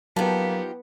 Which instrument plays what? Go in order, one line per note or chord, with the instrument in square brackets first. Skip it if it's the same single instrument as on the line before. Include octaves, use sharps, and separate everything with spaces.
[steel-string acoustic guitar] F3 D#4 G4 [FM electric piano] F#3 A5 B6 [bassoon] A#3 [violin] B3